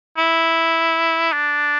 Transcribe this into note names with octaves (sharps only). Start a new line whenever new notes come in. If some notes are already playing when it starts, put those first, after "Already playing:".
E4
D4